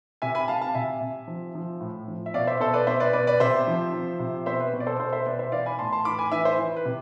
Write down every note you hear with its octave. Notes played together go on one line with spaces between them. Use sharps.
C3 E5 G#5
G#5 B5
C3 F5 A5
F5 A5
C3 E5 G#5
C3
F3
F3
A2
F3
E5
B2 D5 F5
C5 E5
B2 A4 C5
B4 D5
B2 C5 E5
B4 D5
B2 B4 D5
B4 D5
C3 C5 E5
F3
F3
C3
B2 C5 E5
B4
B2
D5
A4 C5
B2 A4 C5
C5 E5
B2 B4 D5
C5 E5
E3 D5 F5
G#5 B5
A2 A5 C6
A5 C6
E3 B5 D6
G#5 B5
E3 E5 G#5
C5 E5
E3
B4
C3